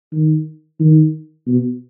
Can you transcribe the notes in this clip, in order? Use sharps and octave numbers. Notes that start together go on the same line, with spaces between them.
D#3
D#3
B2